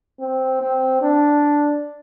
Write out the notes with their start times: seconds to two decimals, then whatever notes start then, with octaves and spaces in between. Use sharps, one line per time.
0.20 C4
0.61 C4
1.02 D4